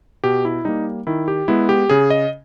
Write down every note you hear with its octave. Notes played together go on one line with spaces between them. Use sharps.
B2 G4
E4
G3 A#3 D#4
D#3 E4
G4
G#3 B3 E4
G4
C#3 G#4
D#5